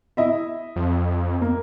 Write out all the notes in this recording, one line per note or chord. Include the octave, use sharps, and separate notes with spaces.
E4 D#5 E5
F2
A#3